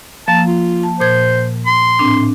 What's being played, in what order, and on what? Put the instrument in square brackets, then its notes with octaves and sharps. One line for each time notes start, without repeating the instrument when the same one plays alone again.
[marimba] F3 A#3 [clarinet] A5
[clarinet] F4
[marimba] A5
[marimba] A#2 G#6 [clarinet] C5
[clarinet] C6
[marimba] A2 C4 D4